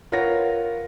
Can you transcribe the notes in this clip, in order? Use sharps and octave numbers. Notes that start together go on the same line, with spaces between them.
F4 A#4 B4 C#5 F#5 A#6